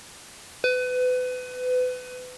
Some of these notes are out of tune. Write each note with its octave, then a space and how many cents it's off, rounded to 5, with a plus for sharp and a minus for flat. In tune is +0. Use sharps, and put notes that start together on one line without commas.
B4 +30